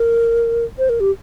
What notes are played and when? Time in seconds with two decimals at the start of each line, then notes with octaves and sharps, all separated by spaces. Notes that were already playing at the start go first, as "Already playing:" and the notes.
Already playing: A#4
0.79 C5
0.89 A#4
1.00 G4